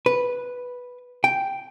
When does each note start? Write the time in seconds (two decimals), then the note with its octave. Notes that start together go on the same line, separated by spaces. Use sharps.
0.06 B4
1.24 G5